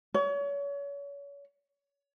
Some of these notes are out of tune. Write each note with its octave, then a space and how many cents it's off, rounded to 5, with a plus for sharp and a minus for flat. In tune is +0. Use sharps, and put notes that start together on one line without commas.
C#5 +35